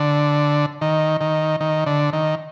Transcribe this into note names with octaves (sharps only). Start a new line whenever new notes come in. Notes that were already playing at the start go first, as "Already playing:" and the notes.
Already playing: D3
D#3
D#3
D#3
D3
D#3